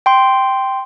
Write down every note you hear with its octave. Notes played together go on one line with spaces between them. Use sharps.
G5 C6